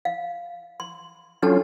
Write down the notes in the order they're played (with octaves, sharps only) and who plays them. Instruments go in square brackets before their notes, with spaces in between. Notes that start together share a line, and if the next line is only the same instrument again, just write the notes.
[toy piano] F5
C6
[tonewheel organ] F#3 C#4 F4 [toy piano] D4 A4 A5